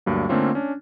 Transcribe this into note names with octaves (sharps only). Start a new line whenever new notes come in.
D2 G2 F#3 A#3
D3 A3 A#3 C4 C#4 F4
C#4 D4